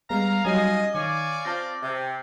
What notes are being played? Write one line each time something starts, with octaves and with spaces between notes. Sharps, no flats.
G3 G#3 B3 F5 A#5
F#3 G3 C#4 D#4 D#5 F5 G#5
D#3 C#5 D5 F5 G#5
C4 F4 A5 A#6
C3